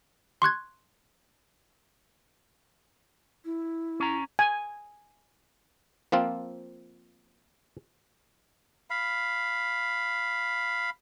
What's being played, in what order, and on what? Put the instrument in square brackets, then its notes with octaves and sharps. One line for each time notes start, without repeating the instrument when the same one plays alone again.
[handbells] C6 C#6 F#6 G#6
[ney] E4
[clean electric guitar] C#4 A#5
[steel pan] G#5
[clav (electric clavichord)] F3 A#3 C4 F4
[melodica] F5 B5